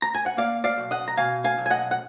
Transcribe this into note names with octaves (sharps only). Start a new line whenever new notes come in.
A#5
G#5
F#5
A#3 D5 F5
D5 F5
B1
D#5 F#5
A#5
B2 F5 G#5
F5 G#5
B1
G#5
D#5 F#5
F#5